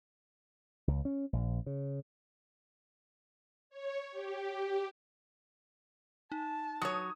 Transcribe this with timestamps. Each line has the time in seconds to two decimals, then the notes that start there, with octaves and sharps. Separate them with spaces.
0.88 C#2
1.05 C#4
1.33 A#1
1.66 C#3
3.70 C#5
4.11 G4
6.32 D#4 A5
6.82 F#3 C#5 D#6